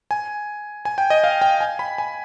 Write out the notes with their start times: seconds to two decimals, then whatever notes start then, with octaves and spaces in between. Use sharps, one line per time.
0.11 G#5
0.85 G#5
0.98 G5
1.10 D#5
1.24 F5
1.42 G5
1.61 G#5
1.79 B5
1.98 G#5